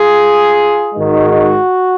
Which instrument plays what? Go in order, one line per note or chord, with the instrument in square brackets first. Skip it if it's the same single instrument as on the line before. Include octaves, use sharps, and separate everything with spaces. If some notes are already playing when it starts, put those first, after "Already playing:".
Already playing: [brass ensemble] F4 G#4
G#2 D#3 G#3 F#4